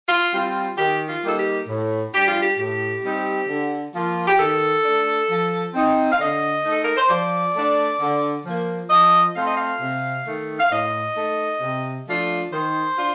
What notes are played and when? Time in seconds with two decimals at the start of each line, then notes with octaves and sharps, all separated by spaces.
0.09 F4
0.33 G3 C4 F4
0.78 D#3 G4
1.08 F4
1.23 G3 A#3 D#4 A4
1.38 G4
1.68 A2
2.13 G3 D4 G4
2.27 F4
2.42 G4
2.58 A2 G4
3.03 G3 C4 D#4
3.48 D3
3.94 F3 A#3 F4
4.28 G4
4.40 D#3 A4
4.84 A3 D4
5.29 F3
5.74 C4 D#4
6.12 F5
6.20 D3 D#5
6.65 A3 D#4
6.72 A4
6.85 A#4
6.97 C5
7.09 F3 D5
7.55 A3 D4
8.00 D3
8.45 F3 A#3
8.90 F3 D#5
9.36 A3 C4 F4 F5
9.46 D#5
9.57 F5
9.81 C3
10.27 D#3 A3
10.60 F5
10.71 A2 D#5
11.16 A3 D#4
11.61 C3
12.07 F3 A3 D4 F4
12.51 D#3 C5
12.98 D4 F4